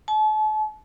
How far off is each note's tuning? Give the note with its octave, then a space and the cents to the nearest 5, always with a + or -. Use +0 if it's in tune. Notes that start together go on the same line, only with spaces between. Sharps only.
A5 -40